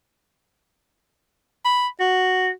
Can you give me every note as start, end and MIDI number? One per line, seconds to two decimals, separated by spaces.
1.65 1.88 83
2.00 2.51 66